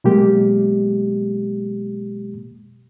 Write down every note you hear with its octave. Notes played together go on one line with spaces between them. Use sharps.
B2 F#3 G#3 A#3 G4